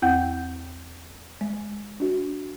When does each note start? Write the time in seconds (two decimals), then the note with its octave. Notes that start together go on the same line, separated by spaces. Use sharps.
0.02 E2 C4 E4 F#5 G5 G6
1.41 G#3
2.00 D4 F#4